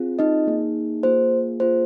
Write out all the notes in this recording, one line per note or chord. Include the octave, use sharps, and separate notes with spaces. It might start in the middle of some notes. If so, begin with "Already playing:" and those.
Already playing: C4 F4 G#4
D#4 D#5
A#3 D#4 G#4
A#3 F4 G#4 C5
A#3 F4 G#4 C5